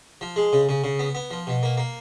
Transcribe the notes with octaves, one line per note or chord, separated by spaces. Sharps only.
F3
G#3
C#3
C#3
C#3
B3
B3
F3
B2
A#3
A#3